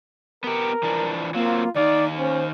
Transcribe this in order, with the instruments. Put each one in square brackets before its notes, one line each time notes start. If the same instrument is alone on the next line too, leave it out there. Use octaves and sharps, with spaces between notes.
[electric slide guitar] B3 G4 [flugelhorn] A#4
[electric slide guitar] E3 F3 D4
[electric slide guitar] F#3 C4 [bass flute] A#3 [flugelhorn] F4
[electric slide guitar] D#3 F5 [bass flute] D#4 [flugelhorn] D5
[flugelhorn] C#4 [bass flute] C5